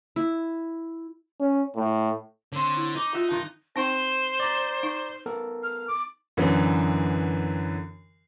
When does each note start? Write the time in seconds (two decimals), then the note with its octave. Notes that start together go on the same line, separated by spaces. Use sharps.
0.16 E4
1.40 C#4
1.76 A2
2.52 D3 C4 C#5
2.76 E4
2.96 D#4 D6
3.14 F4 F#4 E5
3.31 G2 C3 D#3
3.76 C4 D#4 C5 G5
4.40 D5 A#5
4.83 D#4
5.26 B3 A4 A#4
5.63 F6
5.88 D6
6.37 F#2 D3 E3 F#3 B3